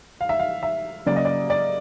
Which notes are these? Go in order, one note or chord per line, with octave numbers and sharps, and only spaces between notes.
F5
E5
F5
E5
C#3 F#3 A#3 D5
D#5
D5
D5